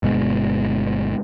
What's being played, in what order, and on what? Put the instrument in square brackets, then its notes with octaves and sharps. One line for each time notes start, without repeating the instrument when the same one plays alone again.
[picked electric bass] G1 B2 G#3